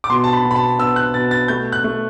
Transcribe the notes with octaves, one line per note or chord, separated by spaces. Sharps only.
D6
B2 C6
A5
B5
B2
B5
A5
B3 E6
F#6
B2 A6
A6
A3 G6
F#6
A3